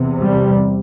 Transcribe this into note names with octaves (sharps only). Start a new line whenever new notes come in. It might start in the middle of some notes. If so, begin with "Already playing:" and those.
Already playing: E2 C3
G3